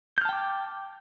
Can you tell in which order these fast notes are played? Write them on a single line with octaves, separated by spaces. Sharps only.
G6 F6 A5 G5 D6